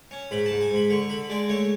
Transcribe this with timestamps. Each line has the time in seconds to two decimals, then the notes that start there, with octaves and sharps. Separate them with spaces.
0.11 C#4
0.31 G#2 B5
0.46 A5
0.51 G#2
0.61 G#5
0.71 G#2
0.76 B5
0.90 D3 C#6
1.10 D3 B5
1.30 G#3 D5
1.49 A3 C#5